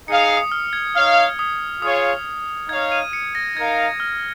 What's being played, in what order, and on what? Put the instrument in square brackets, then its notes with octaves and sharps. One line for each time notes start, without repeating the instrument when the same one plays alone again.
[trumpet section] D#4 G#4 F5 [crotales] C#7
[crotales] C#7
D#6
F6
G#6
[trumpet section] D#4 C#5 F5 [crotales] F6
[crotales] D#6
[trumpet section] F4 G#4 C#5 F5 [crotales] D#6
[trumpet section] D#4 C#5 F5 [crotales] G#6
[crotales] D#7
C#7
A#6
[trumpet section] D#4 A#4 F5 [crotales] G#6
[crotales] F6